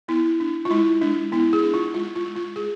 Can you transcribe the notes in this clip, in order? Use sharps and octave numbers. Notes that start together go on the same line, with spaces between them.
B3 E4
D4
F4
G#3 E4
G#3 D4
B3 E4
G#4
D4
F4
G#3 F4
F4
G#3
F4
G#3 G#4